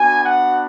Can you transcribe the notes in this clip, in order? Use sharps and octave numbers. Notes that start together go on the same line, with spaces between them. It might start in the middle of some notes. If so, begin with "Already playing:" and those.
Already playing: B3 D4 F#4 G#5
F#5